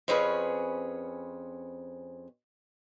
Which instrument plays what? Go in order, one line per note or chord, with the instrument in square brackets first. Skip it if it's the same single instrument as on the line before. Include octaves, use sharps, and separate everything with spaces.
[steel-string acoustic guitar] F2 C4 C#4 G#4 B4 C#5